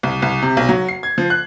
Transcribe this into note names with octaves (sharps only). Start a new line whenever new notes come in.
C2
C2
C3
B1
F#3
C7
G#6
F3
F#6